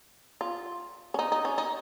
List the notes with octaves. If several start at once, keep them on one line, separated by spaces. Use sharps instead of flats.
F4
C#4
D#4
D#4
C#4
D#4